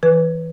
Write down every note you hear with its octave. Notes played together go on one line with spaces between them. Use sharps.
E3 B4